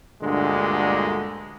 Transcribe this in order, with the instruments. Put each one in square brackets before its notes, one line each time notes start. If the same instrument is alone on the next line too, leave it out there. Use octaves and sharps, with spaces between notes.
[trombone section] D2 G2 A#2 D3 G#3